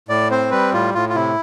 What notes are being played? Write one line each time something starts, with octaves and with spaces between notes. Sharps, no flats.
A2 D5
C4 C5
G3 B4
A2 F4
A2 F4
F4
C3 E4